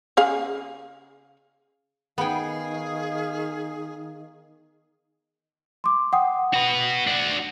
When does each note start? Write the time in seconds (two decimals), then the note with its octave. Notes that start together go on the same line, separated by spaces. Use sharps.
0.17 C#3 G#4 F5
2.18 D#3 B3 G#4 F5 G5
5.84 C6 D6
6.13 F#5 G5 D#6
6.54 F#4 B4
7.07 D4 F#4